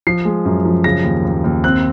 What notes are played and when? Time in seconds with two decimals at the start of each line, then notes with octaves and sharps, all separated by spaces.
0.07 F3 C7
0.25 G#3
0.45 F#2
0.65 F3
0.84 C#3 A#6
1.04 D#2
1.25 D#2
1.44 D#2
1.64 C4 F#6